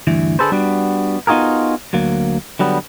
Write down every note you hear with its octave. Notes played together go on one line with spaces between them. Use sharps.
D2 G2 E3
D3 G#4 A4 B4 C5
G3 B3 D4 F#4
B3 D#4 F4 F#4 G#4 A#4
D2 F#3 A#3
D3 F#3 G3 B3